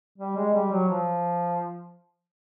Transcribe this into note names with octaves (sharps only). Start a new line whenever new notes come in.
G3
G#3
G3
F#3
F3